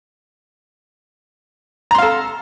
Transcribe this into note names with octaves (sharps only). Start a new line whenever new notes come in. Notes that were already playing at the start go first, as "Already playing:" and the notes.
A4 F5 A#5 C6